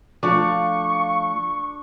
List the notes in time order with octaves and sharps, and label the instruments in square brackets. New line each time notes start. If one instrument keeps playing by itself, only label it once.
[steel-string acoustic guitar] F3 A3 F5 [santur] D4 [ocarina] C#6